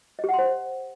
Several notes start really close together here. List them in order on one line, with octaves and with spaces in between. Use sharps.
D#5 G4 F#5 C6 C5